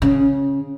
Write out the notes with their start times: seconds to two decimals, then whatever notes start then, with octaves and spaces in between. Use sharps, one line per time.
0.02 C#3